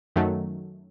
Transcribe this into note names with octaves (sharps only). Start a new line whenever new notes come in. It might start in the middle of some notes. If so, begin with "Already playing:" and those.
F#2 D#3 F#3 A3